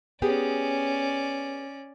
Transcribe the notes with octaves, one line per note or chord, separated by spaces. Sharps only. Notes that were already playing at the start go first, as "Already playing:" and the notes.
B3 C#4 G4 G#4 D5